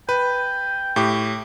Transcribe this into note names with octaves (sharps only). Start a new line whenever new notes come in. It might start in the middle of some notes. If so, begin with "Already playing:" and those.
B4 G5
A2 G4 D6